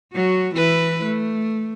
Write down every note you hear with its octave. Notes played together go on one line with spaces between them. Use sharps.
F#3 F#4
E3 E4 B4
A3